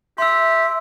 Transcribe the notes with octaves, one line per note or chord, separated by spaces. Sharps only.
G4 E5 C6 E6